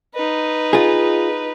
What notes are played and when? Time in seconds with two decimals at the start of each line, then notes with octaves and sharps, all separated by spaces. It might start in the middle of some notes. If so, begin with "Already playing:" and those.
0.14 D#4 B4
0.73 F4 G#4